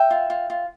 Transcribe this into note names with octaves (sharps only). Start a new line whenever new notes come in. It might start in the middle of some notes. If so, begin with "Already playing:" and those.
Already playing: E5 G5
F4
F4
F4